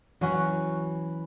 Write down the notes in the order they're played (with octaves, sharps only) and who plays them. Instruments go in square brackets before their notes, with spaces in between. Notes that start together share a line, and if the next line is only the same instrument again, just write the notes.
[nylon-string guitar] E3 [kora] F#3 C#4 F#4